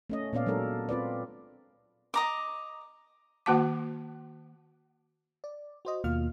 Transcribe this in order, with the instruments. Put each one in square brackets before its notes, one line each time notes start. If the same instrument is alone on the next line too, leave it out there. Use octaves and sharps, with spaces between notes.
[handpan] A3 C#4 D#5
A#2 B3 C#4 D5 F5
F#3 G#3 D4 A4 A#4
C4 F4 B4 D5
[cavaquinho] D#5 A#5 D6
[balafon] D#3 A#3 F#4 F#5 A5 D6
[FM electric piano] D5
F#4 C5 D#5
D#2 B2 A#3 F4 F5 F6